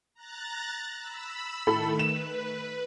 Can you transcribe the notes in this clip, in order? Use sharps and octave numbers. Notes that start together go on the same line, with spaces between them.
A#5 F#6 A6
B5 E6
A2 D#3 A3 A4 B5
B4 E7